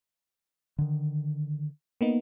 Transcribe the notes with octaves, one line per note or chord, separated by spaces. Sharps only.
D3 D#3
A#3 B3 D#4